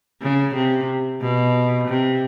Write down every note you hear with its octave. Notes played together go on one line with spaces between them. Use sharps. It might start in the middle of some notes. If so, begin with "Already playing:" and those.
C#3
C3
B2
C3